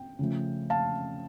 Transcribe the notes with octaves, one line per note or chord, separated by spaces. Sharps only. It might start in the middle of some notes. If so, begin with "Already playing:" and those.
Already playing: G5
C#3 F3 A3
F5 A5